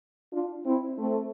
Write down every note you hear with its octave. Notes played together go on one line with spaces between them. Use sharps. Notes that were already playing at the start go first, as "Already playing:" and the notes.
D4 F4
C4 E4
A3 C4